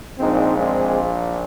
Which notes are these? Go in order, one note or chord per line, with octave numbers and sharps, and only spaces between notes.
A#1 A#2 G#3 C4 D#4
G#3 C4